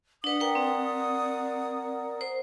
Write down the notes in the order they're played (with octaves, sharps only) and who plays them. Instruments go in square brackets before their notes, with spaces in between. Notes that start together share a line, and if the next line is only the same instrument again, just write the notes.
[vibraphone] D4 B4 [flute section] D5 F#5 D#6
[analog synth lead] A#4 [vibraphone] B4 G5
[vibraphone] C4
C5